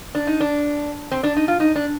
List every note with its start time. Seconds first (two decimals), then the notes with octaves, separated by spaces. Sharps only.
0.15 D4
0.27 D#4
0.41 D4
1.11 C4
1.23 D4
1.37 D#4
1.48 F4
1.60 D#4
1.76 D4